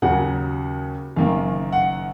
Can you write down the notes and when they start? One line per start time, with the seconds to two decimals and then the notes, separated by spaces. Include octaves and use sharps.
0.02 D#2 C#3 F#3 F#5
1.16 F#1 F#2 D#3 A#3 F5
1.73 F#5